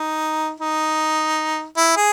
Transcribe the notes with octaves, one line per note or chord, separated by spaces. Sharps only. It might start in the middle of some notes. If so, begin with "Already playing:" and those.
Already playing: D#4
D#4
E4
G#4